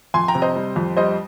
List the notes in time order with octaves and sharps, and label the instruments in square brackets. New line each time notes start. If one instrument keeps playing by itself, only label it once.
[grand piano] F2 G#5 C6
G5 A#5
C3
C5 D#5
G3
F2
G3 C5 D#5